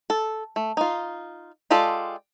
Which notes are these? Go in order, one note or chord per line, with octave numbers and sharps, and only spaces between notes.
A4
A3
D#4 F4
G#3 F4 G4 A4 D5